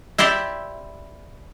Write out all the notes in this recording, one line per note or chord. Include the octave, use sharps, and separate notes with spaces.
E4 G4 C5 D5 E5